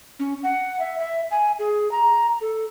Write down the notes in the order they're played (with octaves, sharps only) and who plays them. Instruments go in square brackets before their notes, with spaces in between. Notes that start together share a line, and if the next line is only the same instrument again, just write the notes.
[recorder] C#4
F#5
E5
E5
G#5
G#4
A#5
A4